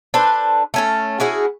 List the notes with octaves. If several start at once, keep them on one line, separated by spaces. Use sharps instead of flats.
D4 A4 B4 C5
A3 C#4 A4
C#4 E4 F#4 G#4